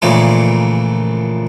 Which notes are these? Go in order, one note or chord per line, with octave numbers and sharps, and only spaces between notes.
A#1 A#2 C#3 E3 A3